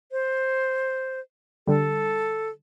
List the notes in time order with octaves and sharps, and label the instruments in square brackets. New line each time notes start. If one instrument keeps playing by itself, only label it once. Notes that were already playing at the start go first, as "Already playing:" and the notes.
[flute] C5
[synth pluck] D3 G3 [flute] A4